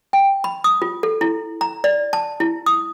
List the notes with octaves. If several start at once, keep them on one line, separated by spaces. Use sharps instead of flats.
G5
B5
D#6
F4
A4
E4
A#5
D5
A5
E4
D#6